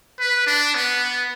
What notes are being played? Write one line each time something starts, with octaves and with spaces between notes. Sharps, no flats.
B4
D4
B3